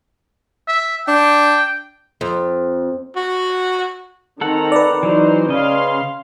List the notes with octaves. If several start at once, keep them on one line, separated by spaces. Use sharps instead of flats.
E5
D4 G5
F2
F#4
D#3 C4 A4 F#5 A#5
B4 D5
E3 F#3 D#4 F#4 C5
C#3 C#4 D#5 F5 C6